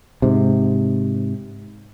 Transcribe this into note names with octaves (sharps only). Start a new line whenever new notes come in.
G#2 C3